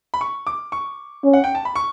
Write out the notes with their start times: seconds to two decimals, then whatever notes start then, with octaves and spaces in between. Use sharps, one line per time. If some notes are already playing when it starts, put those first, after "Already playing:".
0.14 B5
0.21 C#6
0.47 D6
0.72 C#6
1.24 C#4
1.33 F#5
1.44 G5
1.55 A5
1.65 B5
1.76 C#6